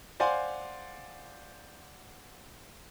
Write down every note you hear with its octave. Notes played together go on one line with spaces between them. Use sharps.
C5 D5 F5 F#5 G#5 C6